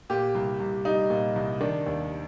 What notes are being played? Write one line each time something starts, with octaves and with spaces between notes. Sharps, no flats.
A#2 G4
C2
C2
G3 D#4
A#2
C2
D#3 D4
D#2